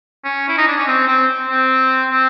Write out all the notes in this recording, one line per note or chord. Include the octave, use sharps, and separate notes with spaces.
C#4
E4
D#4
D4
C#4
C4
C4
C4
C4